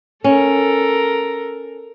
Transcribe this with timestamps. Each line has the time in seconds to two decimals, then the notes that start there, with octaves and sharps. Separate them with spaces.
0.24 C#4 A4 A#4